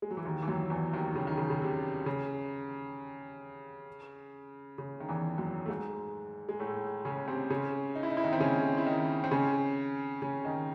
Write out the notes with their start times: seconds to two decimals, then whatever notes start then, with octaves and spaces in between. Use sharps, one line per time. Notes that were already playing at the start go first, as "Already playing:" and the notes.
0.02 G#3
0.11 F#3
0.17 E3
0.25 D#2 D#3
0.42 E3
0.48 F#2 F#3
0.70 E2 E3
0.93 D#2 D#3
1.15 C#3
1.27 D#3
1.37 C#3
1.50 C#3
1.62 C3
2.06 C#3
4.78 C#3
5.00 D#3
5.08 E2 E3
5.38 F#2 F#3
5.66 A3
5.68 G#2 G#3
6.49 G#3
6.59 A2 A3
7.05 C#3 C#4
7.28 C3 C4
7.50 C#3 C#4
7.95 D#4
8.03 E4
8.10 D#4
8.17 E4
8.24 D#3 D#4
8.33 C4
8.40 C#3 C#4
8.77 E4
8.87 D#3 D#4
9.24 C4
9.31 C#3 C#4
10.22 C#3 C#4
10.45 D#3 D#4